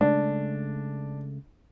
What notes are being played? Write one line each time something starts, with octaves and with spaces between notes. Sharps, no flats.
C#3 G#3 A3 D4